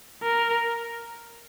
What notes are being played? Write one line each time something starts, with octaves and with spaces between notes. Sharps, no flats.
A#4